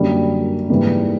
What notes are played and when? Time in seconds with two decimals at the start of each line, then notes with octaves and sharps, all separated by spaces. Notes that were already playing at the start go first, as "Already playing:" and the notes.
Already playing: F#2 D3 G3 A#3
0.70 G#2 E3 G3 A#3